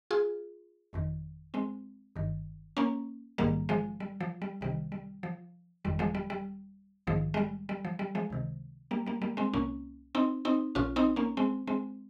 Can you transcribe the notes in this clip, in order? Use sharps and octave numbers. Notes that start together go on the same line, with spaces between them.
F4 G#4
G1 F2 D#3
G#3 C4
G1 G2 D#3
A#3 C#4
A#1 G#2 D#3 G3 A#3
F3 G#3
G3
F3
G3
C2 C3 D#3 G3
G3
F3
G1 F2 D#3 G3
F3 G#3
G3
G3
A#1 G#2 D#3 F3
G#3
G3
G3
F3
G3
F3 G#3
C#2 C3 D#3
G3 A#3
G3 A#3
G3 A#3
G#3 C4
C2 A#2 A#3 C#4
C4 D#4
C4 D#4
A#1 A#2 C#4 F4
C4 D#4
A#3 C#4
G#3 C4
G#3 C4